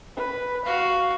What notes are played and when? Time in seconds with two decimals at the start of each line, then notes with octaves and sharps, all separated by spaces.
0.17 B4
0.66 F#4 F5